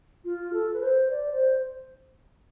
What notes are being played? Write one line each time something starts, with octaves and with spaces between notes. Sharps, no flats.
F4
A4
B4
C5
D5
C5